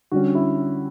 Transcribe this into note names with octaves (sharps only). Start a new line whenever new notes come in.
D3 G3 C#4 F#4
E4